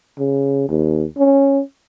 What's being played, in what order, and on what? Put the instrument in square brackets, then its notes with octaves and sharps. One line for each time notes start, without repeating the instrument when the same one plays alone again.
[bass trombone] C#3
D#2
C#4